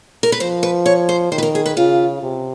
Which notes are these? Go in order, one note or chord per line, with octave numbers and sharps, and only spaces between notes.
A#4
B4
F3 C5
B4
C#5
C5
D#3 C5
B4
A#4
G#4
B4
C#3 F4
C3